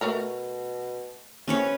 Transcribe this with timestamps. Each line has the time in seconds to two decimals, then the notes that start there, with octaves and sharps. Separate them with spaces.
0.01 B2 A3 A#4 A#5
1.48 C3 C#4 B4 C#5